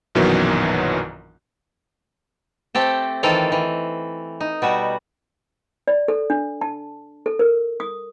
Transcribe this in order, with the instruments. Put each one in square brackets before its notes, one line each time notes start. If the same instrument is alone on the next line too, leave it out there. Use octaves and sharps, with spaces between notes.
[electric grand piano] A#1 F#2 B2 D#3 E3 F#3
[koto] A3 C4 G4 A4
D#3 E3 C4 F4 A4 F5
E3
D#4
B2 G3 F#4
[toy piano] D5
A4
D4
A5
A4
A#4
D#6